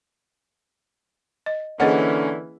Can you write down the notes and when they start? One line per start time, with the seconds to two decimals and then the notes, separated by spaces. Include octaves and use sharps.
1.46 D#5
1.80 D3 E3 A#3 C#4 G#4 D#5 F#5